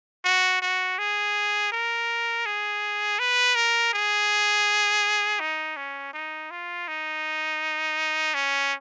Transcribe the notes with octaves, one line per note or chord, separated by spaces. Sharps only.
F#4
F#4
G#4
A#4
G#4
B4
A#4
G#4
D#4
C#4
D#4
F4
D#4
C#4